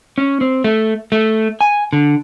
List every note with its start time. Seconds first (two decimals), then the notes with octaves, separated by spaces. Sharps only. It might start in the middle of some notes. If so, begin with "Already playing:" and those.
0.18 C#4
0.41 C4
0.64 A3
1.12 A3
1.61 G#5
1.93 D3